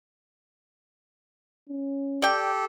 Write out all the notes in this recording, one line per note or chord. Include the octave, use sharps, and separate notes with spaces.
C#4
G4 A4 D5 G5